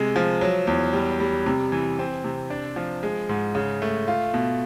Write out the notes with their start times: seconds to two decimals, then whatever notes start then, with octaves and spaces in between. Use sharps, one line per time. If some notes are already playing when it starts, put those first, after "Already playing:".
Already playing: C3 G#3
0.16 F3
0.41 F#3
0.67 E2
0.93 G3
1.20 G3
1.46 C3
1.72 E3
1.99 C4
2.24 C3
2.50 D4
2.76 F3
3.03 G#3
3.29 G#2
3.55 C#3
3.82 A3
4.08 F4
4.34 B2